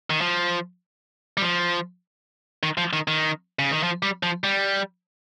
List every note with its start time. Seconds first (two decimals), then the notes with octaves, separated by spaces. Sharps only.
0.10 D#3
0.21 F3
1.37 G3
1.42 F3
2.63 D#3
2.78 F3
2.93 D#3
3.08 D#3
3.59 C#3
3.71 D#3
3.83 F3
4.03 G3
4.23 F3
4.44 G3